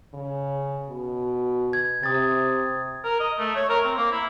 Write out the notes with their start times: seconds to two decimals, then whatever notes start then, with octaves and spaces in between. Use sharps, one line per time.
0.14 C#3
0.88 B2
1.73 G#6
2.03 C3 D#6 A6
3.04 A#4
3.20 D#5
3.39 A3
3.56 C#5
3.70 A#4
3.85 C4
3.97 A#3
4.12 E4